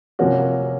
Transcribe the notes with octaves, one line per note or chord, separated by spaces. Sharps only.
C3 F3 A#3 C#4 F#4